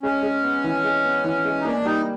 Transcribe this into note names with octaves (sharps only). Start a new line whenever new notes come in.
G#3 C#4
G#3
B3
E3
G#3
B3
E3
G#3
D#4
A#3 D4
G3 D#4